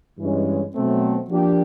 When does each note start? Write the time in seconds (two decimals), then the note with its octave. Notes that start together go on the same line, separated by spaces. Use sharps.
0.18 G2 E3 G#3 C#4
0.75 B2 F#3 A3 C4
1.30 F3 A#3 D4 G4